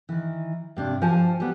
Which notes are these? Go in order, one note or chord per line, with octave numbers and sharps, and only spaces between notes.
D#3 E3
G2 C3 D4
G2 F3 C5 G#5 A5
G3 B3